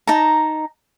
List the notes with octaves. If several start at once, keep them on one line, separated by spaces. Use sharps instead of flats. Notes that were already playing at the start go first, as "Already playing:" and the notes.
D#4 A5 A#5